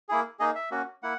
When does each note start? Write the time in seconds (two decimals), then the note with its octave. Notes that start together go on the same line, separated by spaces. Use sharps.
0.09 A#3 E4 G#4
0.39 A#3 D#4 G#4 D#5
0.55 E5
0.71 A#3 C#4 F#4
1.03 A#3 E4 F#5